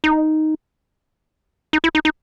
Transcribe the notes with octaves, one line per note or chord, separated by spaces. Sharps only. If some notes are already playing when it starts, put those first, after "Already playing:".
D#4
D#4
E4
D#4
D#4